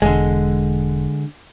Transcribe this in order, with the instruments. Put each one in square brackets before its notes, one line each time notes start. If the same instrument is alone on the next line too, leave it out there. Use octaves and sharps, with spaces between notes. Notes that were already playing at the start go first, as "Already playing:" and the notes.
[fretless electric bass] E1 [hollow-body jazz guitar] D3 G#3